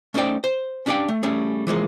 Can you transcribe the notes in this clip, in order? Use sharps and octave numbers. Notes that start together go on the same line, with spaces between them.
A3 C#4 D#4 C5 D5 G5
C5
C#4 D4 G4 D5 F5 G5
A3
G3 A3 C#4 G#4
E3 F3 G#3 A#3